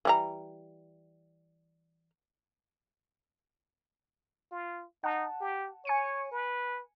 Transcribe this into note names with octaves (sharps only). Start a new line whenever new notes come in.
E3 G3 A#5
F4
D#4 F#5 A5
G4
C#5 G#5 C#7 D#7
B4